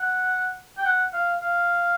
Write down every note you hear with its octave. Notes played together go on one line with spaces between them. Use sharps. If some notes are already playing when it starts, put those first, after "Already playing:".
Already playing: F#5
G5
F#5
F5
F5